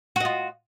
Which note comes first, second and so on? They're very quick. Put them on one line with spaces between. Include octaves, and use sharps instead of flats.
F#4 D#5 F4